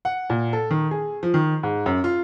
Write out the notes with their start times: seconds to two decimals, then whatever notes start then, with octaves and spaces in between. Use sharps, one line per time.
0.05 F#5
0.30 A#2
0.53 A4
0.71 D#3
0.91 G#4
1.23 F3
1.34 D#3
1.63 G#2
1.86 F#2
2.04 F4